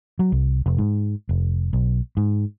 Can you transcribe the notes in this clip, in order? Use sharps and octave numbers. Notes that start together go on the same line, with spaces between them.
F#3
C2
F1
G#2
F1
B1
G#2